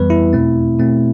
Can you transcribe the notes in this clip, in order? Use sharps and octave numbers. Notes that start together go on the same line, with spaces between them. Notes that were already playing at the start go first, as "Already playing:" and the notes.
Already playing: F2 E3 G3 B3 B4
E4
E2 B2 A3 C4
B2 A3 C4